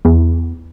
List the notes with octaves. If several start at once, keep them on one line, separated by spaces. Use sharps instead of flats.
E2